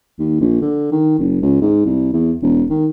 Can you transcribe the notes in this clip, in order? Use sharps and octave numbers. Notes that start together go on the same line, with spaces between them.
D#2
A#1
D3
D#3
F#1
C#2
G#2
C2
E2
E1
D#3